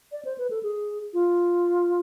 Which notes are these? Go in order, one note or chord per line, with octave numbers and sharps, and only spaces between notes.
D5
C5
B4
A4
G#4
F4